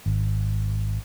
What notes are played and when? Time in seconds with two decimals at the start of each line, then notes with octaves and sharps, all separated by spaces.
0.06 G#1